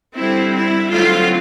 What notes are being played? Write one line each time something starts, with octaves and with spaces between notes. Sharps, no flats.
D3 G3 C4 E4
E4
D3 F#3 A3 C4 F4